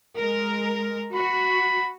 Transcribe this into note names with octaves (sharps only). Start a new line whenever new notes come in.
G#3 A#4
F#4 B5